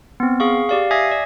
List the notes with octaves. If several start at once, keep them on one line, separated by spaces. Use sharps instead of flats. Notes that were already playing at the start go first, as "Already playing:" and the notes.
B3 C4
G#4 F5 C#6
G4 D5 F5
E5 G#5 D#6 G#6 A#6 C7
D5